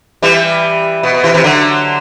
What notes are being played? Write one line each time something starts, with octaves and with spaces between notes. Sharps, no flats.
E3 G3
B2
B2
C3 E3
C3 E3
D3 F#3